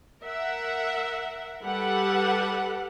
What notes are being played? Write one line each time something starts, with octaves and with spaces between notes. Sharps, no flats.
A#4 E5 F#5
G3 G4 A4 B4 F#5